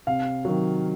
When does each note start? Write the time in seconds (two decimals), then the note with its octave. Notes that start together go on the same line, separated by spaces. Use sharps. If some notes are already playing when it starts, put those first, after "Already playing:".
0.07 C3 F5
0.45 D#3 F#3